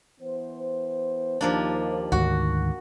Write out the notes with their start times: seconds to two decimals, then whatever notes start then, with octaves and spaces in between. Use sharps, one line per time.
0.21 E3 B3 C5
1.41 D#2 F3 A#3 D4
2.12 D2 G#2 D#3 F#4